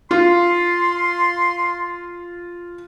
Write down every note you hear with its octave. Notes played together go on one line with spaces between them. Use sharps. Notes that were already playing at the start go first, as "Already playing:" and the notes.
F4 C6